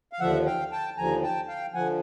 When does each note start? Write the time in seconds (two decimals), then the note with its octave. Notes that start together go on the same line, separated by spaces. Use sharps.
0.13 F5
0.20 D#2 D3 F3 E5 F#5
0.46 F5 G5
0.72 G5 A5
0.97 D#2 D3 F3 G#5 A#5
1.23 G5 A5
1.48 F5 G5
1.74 D3 F3 F#5 G#5